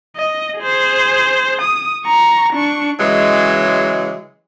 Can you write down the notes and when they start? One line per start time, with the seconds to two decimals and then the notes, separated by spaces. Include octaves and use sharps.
0.16 D#5
0.60 G#4 C5
1.62 D#6
2.06 A#5 C#6
2.54 D4 C#6
3.00 C#3 E3 F#3 G#3